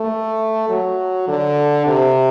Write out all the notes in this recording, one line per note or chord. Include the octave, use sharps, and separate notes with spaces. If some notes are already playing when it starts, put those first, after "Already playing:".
Already playing: A3
F#3
D3
C3